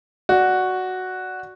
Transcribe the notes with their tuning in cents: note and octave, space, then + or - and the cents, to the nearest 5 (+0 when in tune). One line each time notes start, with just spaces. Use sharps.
F#4 +0 D5 +0